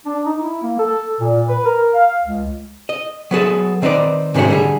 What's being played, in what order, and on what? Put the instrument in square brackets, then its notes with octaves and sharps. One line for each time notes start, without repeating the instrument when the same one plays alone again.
[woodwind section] D4
D#4
E4
A#3
A4
A#2
B4
A#4
F5
C#2
[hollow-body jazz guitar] D#5
F#3 B3 G#4 A4
D#3 C4 D#4 B4 D5
G#2 C3 D#3 A3 C#4 F#4
D3 G3 G#4